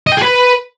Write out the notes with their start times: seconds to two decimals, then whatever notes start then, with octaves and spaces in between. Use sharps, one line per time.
0.07 D#5
0.12 G5
0.17 G#4
0.22 B4